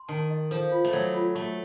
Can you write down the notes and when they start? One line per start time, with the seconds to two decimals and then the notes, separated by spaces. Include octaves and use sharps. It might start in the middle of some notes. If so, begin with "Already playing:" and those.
Already playing: C6
0.08 D#3 A5
0.30 D#5
0.51 F3 A4
0.72 F4
0.85 A3
0.93 F#3 A4
1.14 F4
1.35 A3 C#6